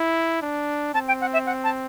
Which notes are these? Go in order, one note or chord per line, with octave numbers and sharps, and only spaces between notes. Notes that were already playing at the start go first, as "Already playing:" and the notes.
Already playing: E4
D4
C4 A5
G5
F#5
E5
F#5
A5